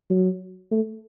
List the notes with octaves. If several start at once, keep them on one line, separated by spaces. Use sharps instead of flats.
F#3
A3